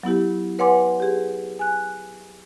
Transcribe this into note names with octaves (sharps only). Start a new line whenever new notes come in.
F#3 B3 E4 G4
B4 C#5 F#5 G#5 C6 D6
G4 G#4
G#5 F#6